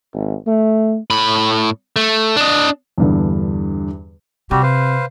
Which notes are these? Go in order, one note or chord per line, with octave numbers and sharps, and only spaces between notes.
G#1
A3
A2 B5
A3
D4 D#5
E2 G2 D3
C3 G3 F#4 G4
B4 C5 F5